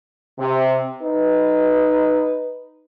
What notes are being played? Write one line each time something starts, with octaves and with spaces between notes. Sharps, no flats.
C3
D#4 B4